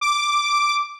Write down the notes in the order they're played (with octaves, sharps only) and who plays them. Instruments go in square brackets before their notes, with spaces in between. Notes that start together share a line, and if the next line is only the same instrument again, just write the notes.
[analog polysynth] D6